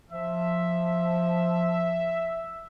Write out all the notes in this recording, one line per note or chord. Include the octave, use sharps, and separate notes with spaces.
F3 E5